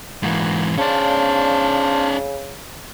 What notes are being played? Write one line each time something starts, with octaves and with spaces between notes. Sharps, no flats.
G#2 E3 A#3 F#4
C#3 C#4 D4 C5 D5 F5